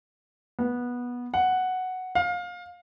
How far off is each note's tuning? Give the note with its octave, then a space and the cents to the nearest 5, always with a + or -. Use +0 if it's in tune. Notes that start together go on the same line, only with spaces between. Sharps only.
B3 -15
F#5 +0
F5 +25